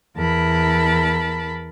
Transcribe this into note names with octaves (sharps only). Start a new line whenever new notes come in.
E2 A#4 A5 B5